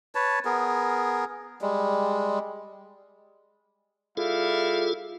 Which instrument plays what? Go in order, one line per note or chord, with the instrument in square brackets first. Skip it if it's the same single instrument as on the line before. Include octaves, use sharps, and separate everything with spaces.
[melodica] B4 C#5 A5
B3 G#4 A#4
G3 G#3
[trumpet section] G3 E4 F5 [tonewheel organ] F4 G#4 A4